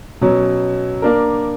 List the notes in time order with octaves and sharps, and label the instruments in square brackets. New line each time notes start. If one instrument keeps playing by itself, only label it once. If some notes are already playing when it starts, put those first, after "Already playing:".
[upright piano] B2 F#3 C#4
A#3 D4 A#4